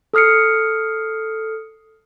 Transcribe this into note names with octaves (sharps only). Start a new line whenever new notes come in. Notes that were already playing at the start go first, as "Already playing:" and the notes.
A4 D#6 F6 C7 C#7